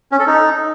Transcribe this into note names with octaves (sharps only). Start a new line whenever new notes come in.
C#4
A4
D#4